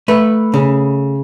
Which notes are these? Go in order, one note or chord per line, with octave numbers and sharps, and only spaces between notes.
A3 B4
C#3